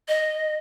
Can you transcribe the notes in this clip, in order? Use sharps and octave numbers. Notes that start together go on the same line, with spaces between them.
D#5